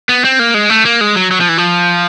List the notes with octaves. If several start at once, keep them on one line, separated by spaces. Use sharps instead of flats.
B3
C4
A#3
G#3
A3
A#3
G#3
F#3
F#3
F3
E3
F3